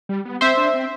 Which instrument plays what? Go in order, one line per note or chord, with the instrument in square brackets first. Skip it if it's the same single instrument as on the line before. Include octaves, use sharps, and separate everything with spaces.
[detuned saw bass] G3
B3
[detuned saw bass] C4 [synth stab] C5 E5
[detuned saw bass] D4
C4